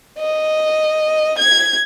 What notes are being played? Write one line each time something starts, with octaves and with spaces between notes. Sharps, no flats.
D#5
G#6